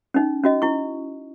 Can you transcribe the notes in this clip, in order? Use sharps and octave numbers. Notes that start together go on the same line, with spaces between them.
C#4 D#4
C#4 F#4 D#5
E4 C#6